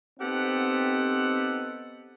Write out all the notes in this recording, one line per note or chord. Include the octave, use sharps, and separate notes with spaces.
B3 C4 D#4 G4 A4 F#5